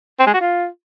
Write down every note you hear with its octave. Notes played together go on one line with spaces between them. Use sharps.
C4
G#3
F#4
F4